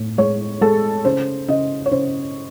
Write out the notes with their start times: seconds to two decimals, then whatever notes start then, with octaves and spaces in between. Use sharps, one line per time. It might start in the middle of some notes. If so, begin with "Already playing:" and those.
Already playing: A2
0.18 G#3 C#5
0.61 G#3 A4
1.05 C#3 C5
1.48 C#3 D#5
1.86 C#5
1.92 C#3 C5